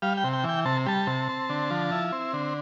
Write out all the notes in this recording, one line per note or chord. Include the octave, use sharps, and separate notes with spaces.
G3 F5
G5
C3
G5
E3
G5
C3 A5
G3 A5
C3
C4
D3
F3
E4
C4
D3